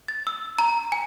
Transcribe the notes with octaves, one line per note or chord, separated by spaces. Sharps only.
A6
E6
A#5
G#5